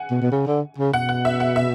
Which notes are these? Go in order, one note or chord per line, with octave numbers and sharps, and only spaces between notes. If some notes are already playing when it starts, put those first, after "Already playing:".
Already playing: F#5 G#5
B2
B2
C#3
D3
C#3
B2 F#5
F#5
E5
F#5
E5